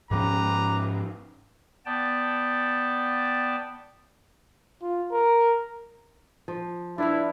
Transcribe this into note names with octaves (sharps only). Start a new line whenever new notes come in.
G#2 F3 C#4 G4 B4 A#5
B3 D5 G5 A5
F4
A#4
F3
D4 E4 B4 F5